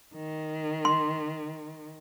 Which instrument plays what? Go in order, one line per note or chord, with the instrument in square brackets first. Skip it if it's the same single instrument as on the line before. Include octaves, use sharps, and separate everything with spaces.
[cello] D#3
[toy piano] C6